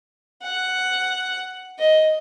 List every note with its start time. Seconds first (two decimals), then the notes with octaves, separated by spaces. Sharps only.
0.43 F#5
1.79 D#5